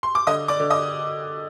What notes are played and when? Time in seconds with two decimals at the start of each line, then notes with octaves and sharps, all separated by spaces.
0.03 C6
0.15 D6
0.27 D3 D#5 D#6
0.48 D5 D6
0.60 D3
0.70 D#5 D#6